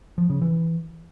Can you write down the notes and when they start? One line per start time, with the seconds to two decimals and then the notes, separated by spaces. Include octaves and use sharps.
0.18 F3
0.30 C#3
0.42 E3